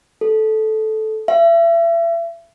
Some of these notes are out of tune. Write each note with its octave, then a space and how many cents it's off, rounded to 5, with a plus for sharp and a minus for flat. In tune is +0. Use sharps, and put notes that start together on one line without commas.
A4 -10
E5 +35